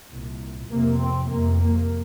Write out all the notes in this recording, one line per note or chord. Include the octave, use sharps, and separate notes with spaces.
C2 A#2
F2 C3 A#3
C4
F2 C3 A#3
A#3